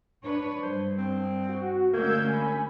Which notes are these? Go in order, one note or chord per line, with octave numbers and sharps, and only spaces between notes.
D4 B4 C#5
G2 C5
C4
F#4
D2 G#3 A#3 C#4 E6 G6 G#6
G#5 B5